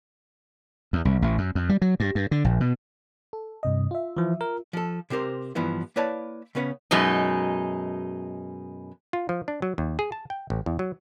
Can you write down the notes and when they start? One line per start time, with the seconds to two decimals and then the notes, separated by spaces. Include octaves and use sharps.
0.93 E2
1.05 C2
1.22 A1
1.38 F#2
1.55 F2
1.69 G3
1.82 F#3
2.00 G2
2.15 G2
2.31 D3
2.44 A#1
2.60 B2
3.33 A4
3.63 G2 C3 D#5
3.91 F4 E5
4.17 E3 F3
4.41 A#4
4.73 F3 A4
5.10 C3 C4 G4 A#4 C5
5.55 G2 E3 F3 B3 E4
5.96 A#3 E4 B4 C#5 D5 A5
6.55 C#3 B3 C#4 B4 F5 F#5
6.91 F#2 B2 G#3 D#4
9.13 F4
9.29 F3
9.48 D4
9.62 F#3
9.78 D#2
9.99 G#4
10.12 A5
10.30 G5
10.50 A1
10.66 E2
10.79 F#3